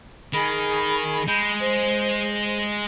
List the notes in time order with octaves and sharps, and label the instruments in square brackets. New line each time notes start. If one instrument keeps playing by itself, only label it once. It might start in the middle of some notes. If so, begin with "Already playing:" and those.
[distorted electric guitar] D#3 [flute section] G#4 B5
[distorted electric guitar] G#3 [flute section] B5 G6
[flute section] C5